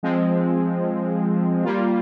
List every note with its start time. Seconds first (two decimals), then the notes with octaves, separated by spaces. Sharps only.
0.03 F3 G#3 C4
1.64 G3 A#3 F4